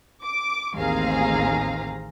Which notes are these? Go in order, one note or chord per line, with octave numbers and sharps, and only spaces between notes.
D6
A1 D#2 C4 G#4 F5 A#5